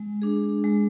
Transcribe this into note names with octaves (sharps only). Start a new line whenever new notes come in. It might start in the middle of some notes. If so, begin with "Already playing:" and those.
Already playing: G#3
D4 G#4
G#3